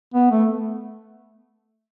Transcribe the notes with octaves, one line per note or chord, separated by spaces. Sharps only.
B3
A3